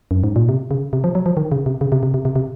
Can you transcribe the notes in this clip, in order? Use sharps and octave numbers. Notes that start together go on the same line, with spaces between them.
F#2
G#2
A#2
C3
C#3
C3
F3
F#3
F3
D#3
C#3
C3
C#3
C3
C3
C3
C3
C3